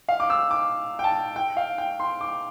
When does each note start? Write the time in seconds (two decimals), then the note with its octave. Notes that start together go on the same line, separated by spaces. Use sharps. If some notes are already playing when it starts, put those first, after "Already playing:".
0.09 F5
0.20 D6
0.30 E6
0.51 D6
0.99 G5
1.04 A5
1.36 G5
1.57 F5
1.78 G5
2.00 C6
2.21 D6